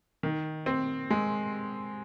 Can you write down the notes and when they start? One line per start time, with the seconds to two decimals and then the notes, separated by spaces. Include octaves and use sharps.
0.23 D#3
0.66 C4
1.10 G#3